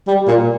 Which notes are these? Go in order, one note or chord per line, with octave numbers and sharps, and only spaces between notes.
G3
A#2